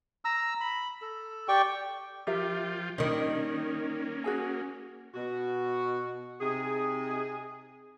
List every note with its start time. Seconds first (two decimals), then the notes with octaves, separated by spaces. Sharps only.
0.25 A#5 E6
0.61 B5
1.02 A4
1.48 G4 D5 G5 C#6
2.27 F3 F4 G4 A#4 E5 G5
2.98 D#3 G3 A#3 C#4 D4
4.24 F#4 G#4 G#5
5.14 B2 F#4
6.41 C3 D#4 G#4